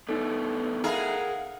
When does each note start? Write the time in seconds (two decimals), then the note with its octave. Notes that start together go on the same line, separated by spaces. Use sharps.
0.09 A3 B3 D4 D#4 A4
0.84 E4 G#4 A#4 F5 F#5